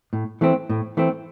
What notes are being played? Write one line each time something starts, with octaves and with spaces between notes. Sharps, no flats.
A2
E3 A3 C4
A2
E3 A3 C4